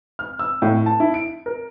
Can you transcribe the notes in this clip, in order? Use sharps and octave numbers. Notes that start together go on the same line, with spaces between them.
F6
E6
A2
A5
E4
D7
A#4